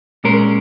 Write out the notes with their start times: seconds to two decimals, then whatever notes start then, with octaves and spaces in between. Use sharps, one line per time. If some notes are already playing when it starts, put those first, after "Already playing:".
0.24 A#2 G#3 C#4 A#4